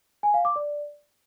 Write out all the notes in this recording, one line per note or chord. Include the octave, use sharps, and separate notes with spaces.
G#5
F5
D6
D5